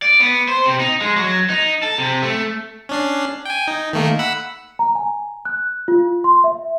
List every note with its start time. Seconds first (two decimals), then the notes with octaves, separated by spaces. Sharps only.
0.02 D5
0.20 B3
0.48 C5
0.66 C3
0.80 D#4
1.01 G#3
1.17 F#3
1.49 D#4
1.83 A4
1.98 C3
2.22 A3
2.89 C#4 D4 C7
3.45 G5 G#5
3.68 D#4
3.93 D#3 A3 A#3
4.19 F#5 B5 E6
4.79 A#5
4.95 G#5
5.45 F#6
5.88 F4
6.24 C6
6.44 E5